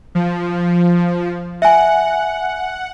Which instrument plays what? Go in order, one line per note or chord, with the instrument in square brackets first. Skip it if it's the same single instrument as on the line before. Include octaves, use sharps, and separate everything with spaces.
[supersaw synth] F3
[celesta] E5 G#5 [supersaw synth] F#5